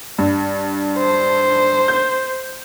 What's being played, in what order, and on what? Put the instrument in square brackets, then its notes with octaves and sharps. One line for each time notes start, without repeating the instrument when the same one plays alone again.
[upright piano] G2
[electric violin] C5
[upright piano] G6